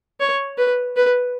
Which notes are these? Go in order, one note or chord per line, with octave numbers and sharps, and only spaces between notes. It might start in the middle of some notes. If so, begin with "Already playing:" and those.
C#5
B4
B4